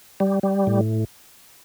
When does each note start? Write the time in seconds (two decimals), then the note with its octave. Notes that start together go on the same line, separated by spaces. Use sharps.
0.20 G3
0.43 G3
0.67 A2